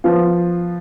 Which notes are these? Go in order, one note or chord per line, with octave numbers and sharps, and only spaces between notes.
F3 B3 F4